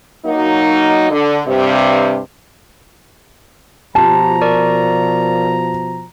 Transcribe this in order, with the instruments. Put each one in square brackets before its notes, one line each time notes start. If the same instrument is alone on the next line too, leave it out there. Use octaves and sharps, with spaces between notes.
[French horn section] F#3 A#3 D#4
D3
G2 C3
[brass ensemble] B2 F3 A#5 [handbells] F4 G4 [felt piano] A5
[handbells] A#4 D5 C#6